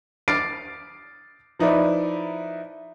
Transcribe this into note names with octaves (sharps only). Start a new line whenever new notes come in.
D6 F6 A6 C7 D7
F3 D#4 E4 B4 D5